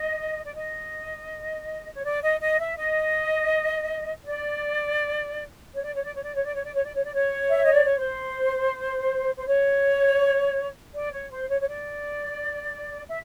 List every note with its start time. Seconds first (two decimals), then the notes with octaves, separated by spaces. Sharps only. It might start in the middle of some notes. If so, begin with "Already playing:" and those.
Already playing: D#5
0.45 D5
0.55 D#5
1.94 C#5
2.03 D5
2.22 D#5
2.40 D#5
2.58 E5
2.77 D#5
4.26 D5
5.74 C#5
5.84 D5
5.94 C#5
6.04 D5
6.15 C#5
6.24 D5
6.34 C#5
6.44 D5
6.54 C#5
6.64 D5
6.74 C#5
6.84 D5
6.94 C#5
7.04 D5
7.14 C#5
7.50 E5
7.63 D#5
7.73 D5
7.85 C#5
7.97 C5
9.38 C5
9.46 C#5
10.94 D5
11.12 C#5
11.31 C5
11.49 C#5
11.61 C#5
11.68 D5
13.08 E5